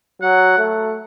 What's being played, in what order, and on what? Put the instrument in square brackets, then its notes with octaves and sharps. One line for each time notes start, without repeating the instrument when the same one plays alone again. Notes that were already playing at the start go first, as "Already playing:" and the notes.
[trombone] F#3 [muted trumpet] F#5
[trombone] A3